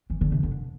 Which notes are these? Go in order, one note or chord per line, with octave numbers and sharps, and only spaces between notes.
E3
D3
C3
D3